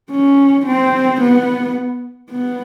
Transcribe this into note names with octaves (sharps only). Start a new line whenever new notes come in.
C#4
C4
B3
B3